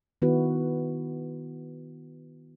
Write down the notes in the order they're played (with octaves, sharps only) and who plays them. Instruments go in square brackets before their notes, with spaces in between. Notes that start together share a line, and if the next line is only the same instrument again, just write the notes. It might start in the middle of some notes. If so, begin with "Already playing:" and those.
[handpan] D#3 B3 E4 F#4 B4